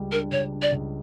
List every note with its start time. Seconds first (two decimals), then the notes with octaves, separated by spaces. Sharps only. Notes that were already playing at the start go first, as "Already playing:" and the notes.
Already playing: C#2 C#3 G3
0.12 D4 A#4
0.31 C#2 C#5
0.52 D4
0.62 D5
0.72 C#2